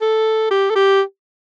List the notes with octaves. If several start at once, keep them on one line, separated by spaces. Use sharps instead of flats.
A4
G4
A4
G4